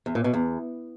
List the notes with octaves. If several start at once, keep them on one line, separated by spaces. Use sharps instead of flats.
E2
A#2
B2
E2